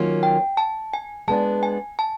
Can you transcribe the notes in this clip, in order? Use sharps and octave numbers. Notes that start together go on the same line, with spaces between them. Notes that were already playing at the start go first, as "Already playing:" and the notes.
Already playing: D#3 F#3 A#3 C#4 F4
G5
A5
G#5
G#3 B3 D4 A5
G#5
A5